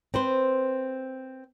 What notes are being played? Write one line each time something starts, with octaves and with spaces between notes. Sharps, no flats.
C4 B4 C5